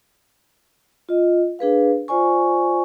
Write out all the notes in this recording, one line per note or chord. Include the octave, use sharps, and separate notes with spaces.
F4 D#5
D4 G#4 B4 F5
F4 C5 D5 G#5 C#6